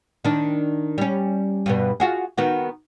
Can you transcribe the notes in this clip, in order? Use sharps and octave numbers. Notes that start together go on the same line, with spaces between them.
D#3 D4
G3 C#4
G2 B2 B3
F4 F#4 G#4
D#3 B3 F#4